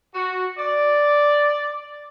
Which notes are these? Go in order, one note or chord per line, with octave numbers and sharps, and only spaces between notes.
F#4
D5